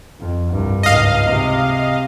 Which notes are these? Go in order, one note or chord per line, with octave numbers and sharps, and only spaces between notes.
F2
C2 G2
C#2 G#2 D#5 F5
C3